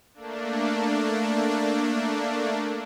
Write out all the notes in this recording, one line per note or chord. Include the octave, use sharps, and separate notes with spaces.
A3 A#3 D4